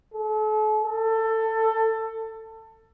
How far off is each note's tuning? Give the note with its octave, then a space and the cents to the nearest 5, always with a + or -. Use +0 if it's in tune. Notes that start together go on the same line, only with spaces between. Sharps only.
A4 -40
A4 +20